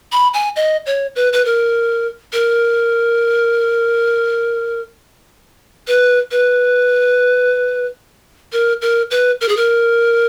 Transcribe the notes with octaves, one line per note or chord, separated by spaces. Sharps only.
B5
G#5
D#5
C#5
B4
B4
A#4
A#4
B4
B4
A#4
A#4
B4
A#4
G#4
A#4